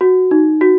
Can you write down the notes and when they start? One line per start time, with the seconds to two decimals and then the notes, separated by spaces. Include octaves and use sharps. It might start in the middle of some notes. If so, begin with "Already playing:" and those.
0.01 F#4
0.31 D#4
0.61 F#4